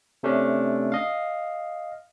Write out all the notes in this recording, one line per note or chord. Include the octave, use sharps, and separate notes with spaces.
C3 A3 C#4 D4
D#5 F5